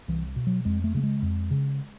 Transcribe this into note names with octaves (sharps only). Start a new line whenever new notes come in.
C2 E3
B2
F#3
F2 G#3
A3
C#3 A3
G#3
F2
C#3